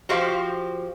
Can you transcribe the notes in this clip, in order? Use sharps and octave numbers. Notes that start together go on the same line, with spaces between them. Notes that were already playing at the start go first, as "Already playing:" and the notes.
F3 F#4 G4 C5 F5